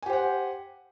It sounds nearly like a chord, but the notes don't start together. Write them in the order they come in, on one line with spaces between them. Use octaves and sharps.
G#5 G4 C5 F#5